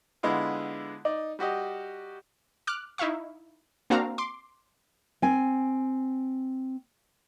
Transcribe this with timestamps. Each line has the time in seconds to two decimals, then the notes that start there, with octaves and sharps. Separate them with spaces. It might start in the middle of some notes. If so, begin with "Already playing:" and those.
0.23 D3 G#3 B3 E4 F4
1.05 D#4 D5
1.39 G3 F#4 G4 D#5
2.67 D6 F6 F#6
2.98 D#4 E4 E5 F5 C#6
3.90 A#3 C4 D4 F#4 F5 A#5
4.18 C6 D6
5.22 C4 G#5